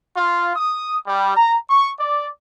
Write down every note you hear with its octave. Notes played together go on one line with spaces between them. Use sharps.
F4
D#6
G3
A#5
C#6
D5